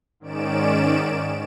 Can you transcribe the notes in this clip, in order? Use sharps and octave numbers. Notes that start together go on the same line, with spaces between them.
G#2 D#3 C#4 D5 D7 E7